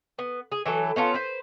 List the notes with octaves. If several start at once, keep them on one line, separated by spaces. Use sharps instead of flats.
B3
G#4
E3 F#3 A4
B3 C#4 F4 A4
B4 C5